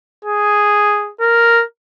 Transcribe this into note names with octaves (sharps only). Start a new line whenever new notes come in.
G#4
A#4